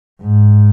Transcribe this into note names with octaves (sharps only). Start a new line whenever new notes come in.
G#2